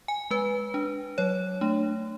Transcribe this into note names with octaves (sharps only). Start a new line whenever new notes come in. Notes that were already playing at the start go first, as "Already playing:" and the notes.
G#5
G#3 B4
D4
F#3 C#5
A3 D4